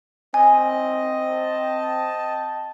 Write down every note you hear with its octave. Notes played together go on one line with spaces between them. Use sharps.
C4 D#5 G#5
G5 A5